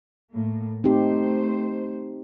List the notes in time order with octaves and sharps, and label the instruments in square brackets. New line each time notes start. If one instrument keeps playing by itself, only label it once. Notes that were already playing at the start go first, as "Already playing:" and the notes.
[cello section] A2 A#3
[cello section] A3 C5 [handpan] C4 D#4 G4